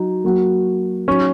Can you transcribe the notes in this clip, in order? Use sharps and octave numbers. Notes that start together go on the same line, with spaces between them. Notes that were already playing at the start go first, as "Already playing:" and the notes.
Already playing: F#3 D#4 F#4
F#3 A#3 F#4
F#3 C#4 D#4 F#4